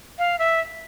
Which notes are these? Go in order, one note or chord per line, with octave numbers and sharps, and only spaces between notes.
F5
E5